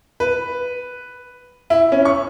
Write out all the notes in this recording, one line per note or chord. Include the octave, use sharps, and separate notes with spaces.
B4
E4
C#4
C#6